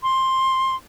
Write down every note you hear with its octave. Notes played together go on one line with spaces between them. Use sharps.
C6